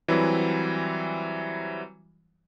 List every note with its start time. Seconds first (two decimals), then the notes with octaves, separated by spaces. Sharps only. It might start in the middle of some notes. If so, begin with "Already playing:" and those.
0.08 E3 F#3 G3 C4 E4